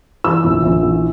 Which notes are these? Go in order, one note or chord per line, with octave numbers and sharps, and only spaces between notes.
E3 E6
A#1
A#1
E3